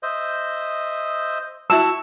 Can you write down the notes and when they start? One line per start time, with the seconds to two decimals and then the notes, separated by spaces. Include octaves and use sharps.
0.03 C5 D#5 E5
1.70 E4 F#4 A5 C#6 E6